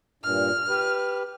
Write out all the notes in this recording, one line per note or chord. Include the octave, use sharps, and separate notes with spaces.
G2 A#2 F6
G4 B4